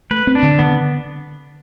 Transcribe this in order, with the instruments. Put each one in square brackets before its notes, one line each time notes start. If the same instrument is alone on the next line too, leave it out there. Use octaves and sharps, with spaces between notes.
[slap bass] A3 [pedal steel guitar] B4
[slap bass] C4
[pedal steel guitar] D4
[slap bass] D3
[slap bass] D3 [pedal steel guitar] B3